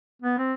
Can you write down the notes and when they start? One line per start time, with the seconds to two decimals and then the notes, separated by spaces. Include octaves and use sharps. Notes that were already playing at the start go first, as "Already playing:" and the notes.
0.22 B3
0.38 C4